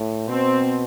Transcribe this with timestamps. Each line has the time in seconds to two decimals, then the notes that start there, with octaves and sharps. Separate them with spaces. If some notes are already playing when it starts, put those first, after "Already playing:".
Already playing: A2
0.29 B2 C4